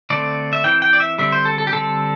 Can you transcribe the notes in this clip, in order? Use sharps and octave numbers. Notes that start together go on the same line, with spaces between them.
D3 A3 C4 D5
E5
E3 C4 G5
G5
D5
E5
D3 G3 C4 E5
C5
A4
A4
G4
D3 G3 C4 A4